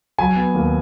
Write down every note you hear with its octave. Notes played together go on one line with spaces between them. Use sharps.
F#3 G#5
B3
D#2